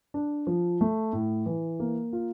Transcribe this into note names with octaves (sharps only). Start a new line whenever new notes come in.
D4
F3
A3
A2
E3
A#3
F4